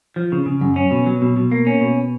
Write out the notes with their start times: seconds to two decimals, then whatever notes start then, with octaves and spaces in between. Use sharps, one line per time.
0.16 F3
0.32 C#3
0.46 C#3
0.61 F#2
0.76 C#4
0.91 B2
1.06 F#3
1.22 B2
1.37 B2
1.52 A#3
1.67 C#4
1.81 B2